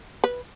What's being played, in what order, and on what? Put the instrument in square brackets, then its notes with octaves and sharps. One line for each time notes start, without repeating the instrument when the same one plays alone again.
[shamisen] B4